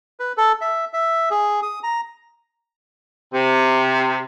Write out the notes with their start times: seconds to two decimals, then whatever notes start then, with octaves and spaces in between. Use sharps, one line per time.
0.20 B4
0.37 A4
0.61 E5
0.93 E5
1.31 G#4
1.63 D#6
1.83 A#5
3.33 C3